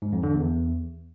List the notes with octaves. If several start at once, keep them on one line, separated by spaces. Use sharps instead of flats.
G#2
F2
D3
E2